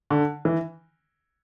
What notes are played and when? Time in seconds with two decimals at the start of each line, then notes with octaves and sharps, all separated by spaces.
0.10 D3
0.45 E3